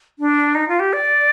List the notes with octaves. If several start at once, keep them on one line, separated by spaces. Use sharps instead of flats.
D4
D#4
F4
G4
D5